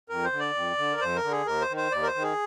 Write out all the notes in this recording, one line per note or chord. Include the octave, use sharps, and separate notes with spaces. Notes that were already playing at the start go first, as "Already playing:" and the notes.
F2 A#4
C5
D3
D5
F2
D3
A#4
F2 C5
A#4
D3
G#4
D#2 A#4
C5
D#3
C5
D#2 D5
A#4
C5
D#3
G#4